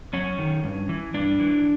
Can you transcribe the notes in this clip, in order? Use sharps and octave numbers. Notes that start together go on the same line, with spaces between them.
F#2 C#4
D#3
G2
E3
G2 D4
E3